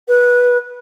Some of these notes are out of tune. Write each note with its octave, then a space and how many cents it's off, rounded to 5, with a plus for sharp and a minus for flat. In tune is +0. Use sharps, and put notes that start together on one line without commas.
B4 -15